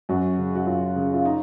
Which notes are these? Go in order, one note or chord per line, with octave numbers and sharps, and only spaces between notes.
F#2 F#4
C#3
F#4
F#2 F4
C#3
F4
D#4